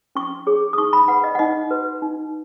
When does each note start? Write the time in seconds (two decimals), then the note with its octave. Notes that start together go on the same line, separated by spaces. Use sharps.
0.15 C#4 C#6
0.47 G#4 C#5
0.73 D#6
0.78 D#4 C#6
0.93 B5
1.08 B4 F#5
1.24 D#5
1.35 F#5
1.39 D#4 D#5
1.71 F#4 B4
2.02 D#4